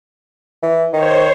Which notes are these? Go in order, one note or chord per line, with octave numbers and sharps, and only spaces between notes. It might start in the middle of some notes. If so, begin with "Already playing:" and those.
E3
D#3 C5 C#5